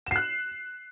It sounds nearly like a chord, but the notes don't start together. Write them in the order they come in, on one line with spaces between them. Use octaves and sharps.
E7 C7 F#6